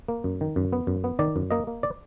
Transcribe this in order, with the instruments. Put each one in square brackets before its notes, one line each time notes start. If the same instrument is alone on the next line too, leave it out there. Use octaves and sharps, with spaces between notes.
[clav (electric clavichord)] A#3
F#2
D#3
F#2
B3
F#2
B3
D#3 D5
F#2
A#3 D#5
A#3
D5